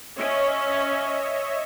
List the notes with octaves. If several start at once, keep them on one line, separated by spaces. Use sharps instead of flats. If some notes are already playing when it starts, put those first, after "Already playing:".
C#4 C#5 D#5 E5